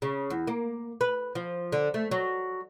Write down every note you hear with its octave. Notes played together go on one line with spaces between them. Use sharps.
C#3
E2
A#3
B4
F3
D3
A3
F#3